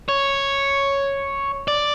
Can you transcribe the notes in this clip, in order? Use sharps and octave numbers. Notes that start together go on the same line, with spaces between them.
C#5
D5